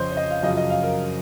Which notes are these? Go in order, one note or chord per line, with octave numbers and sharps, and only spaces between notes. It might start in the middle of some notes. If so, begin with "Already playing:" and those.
Already playing: F2 C#3 F3 C5 C#5 D#5
C#5
D#5
F5
F#2 C#3 F3 D#5
D#5
F5
A#4